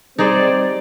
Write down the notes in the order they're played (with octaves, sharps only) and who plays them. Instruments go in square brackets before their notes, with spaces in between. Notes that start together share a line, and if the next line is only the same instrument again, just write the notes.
[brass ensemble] G3 [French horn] C4 [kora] D#4 G#4 C5 [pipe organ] D5